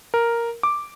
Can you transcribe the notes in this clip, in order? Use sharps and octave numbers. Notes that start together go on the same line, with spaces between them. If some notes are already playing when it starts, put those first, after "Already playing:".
A#4
D6